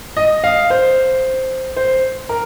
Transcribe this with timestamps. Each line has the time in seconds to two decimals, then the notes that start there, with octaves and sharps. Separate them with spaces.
0.17 D#5
0.44 F5
0.70 C5
1.77 C5
2.29 A#4